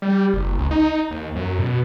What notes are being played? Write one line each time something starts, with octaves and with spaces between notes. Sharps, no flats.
G3
F#1
C#2
D#4
D#2
F#2
B2